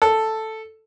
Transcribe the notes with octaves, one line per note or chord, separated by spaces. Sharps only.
A4